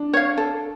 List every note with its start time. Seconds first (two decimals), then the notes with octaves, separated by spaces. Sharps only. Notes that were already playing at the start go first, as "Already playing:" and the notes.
Already playing: D4
0.13 C#5 F5
0.38 A4